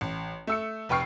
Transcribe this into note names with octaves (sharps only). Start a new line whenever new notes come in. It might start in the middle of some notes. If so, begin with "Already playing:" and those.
A1
A3 E6 C#7
F1 B4 G5 C#6 F6 C7